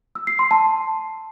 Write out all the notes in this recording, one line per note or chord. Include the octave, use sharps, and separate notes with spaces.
E6
C7
C6
A5